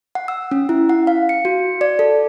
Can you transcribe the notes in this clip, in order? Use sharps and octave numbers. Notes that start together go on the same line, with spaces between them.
F#5
E6
C#4
E4
F#5
F5
C#7
F#4
D5
A4